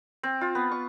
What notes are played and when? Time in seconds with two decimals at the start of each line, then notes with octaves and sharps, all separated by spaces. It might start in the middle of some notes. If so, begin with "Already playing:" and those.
0.23 C4
0.41 F4
0.55 B3
0.71 C#6